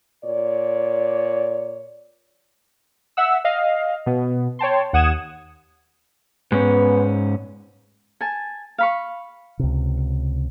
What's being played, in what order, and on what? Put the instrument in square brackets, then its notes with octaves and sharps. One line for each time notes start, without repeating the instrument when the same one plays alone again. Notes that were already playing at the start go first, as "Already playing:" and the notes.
[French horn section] A#2 C#5 D5
[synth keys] E5 F#5 E6
D#5 F5
B2 B3
C#5 G5 A5 C6
D#2 F#5 D#6 G#6 E7
[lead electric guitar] G#2 C#4 [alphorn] B3
[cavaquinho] G#5 A5
F5 B5 C#6
[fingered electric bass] C#2 C3